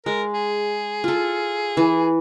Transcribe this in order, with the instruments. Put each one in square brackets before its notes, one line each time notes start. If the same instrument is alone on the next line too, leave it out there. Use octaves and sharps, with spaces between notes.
[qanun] G#3 [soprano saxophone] A#4
[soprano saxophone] G#4
[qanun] F4 A4
E3